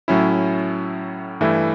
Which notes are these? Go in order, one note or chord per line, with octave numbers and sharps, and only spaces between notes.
A2 F#3 C#4 E4
G2 E3 A3 E4